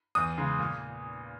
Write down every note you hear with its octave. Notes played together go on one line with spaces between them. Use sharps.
E2 D#6
C#3 G#3
A#2